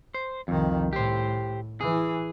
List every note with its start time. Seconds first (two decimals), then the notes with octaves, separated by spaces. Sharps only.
0.14 C5
0.48 C2 F2 D#3
0.93 A2 G4 C5
1.81 E3 G#4